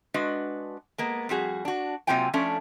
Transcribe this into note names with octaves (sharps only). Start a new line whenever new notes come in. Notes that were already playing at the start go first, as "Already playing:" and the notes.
G#3 D4 F#4 B4 D#5
G#3 A#3 B3
F2 G3 F#4 G#4
D4 F#4
C3 F#3 A#3 F4 G5 G#5
F3 A3 C#4 D4